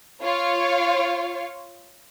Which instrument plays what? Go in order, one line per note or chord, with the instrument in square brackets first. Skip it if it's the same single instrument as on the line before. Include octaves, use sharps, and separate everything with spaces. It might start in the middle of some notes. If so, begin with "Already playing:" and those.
[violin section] F4 C#5 F5